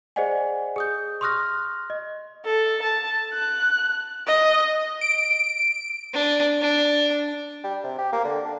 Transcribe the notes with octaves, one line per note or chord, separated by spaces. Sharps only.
G#4 C5 D5 D#5 F#5 G#5
G#4 D#6 G6
C6 C#6 D#6 F6 F#6 A#6
D#5
A4
A5
F#6
D#5
D7
D4
D4
G3
C3
G4
A#3
D3
D4